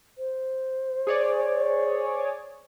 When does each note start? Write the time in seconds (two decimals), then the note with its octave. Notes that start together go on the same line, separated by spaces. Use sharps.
0.18 C5
1.07 G#4 C#5 D5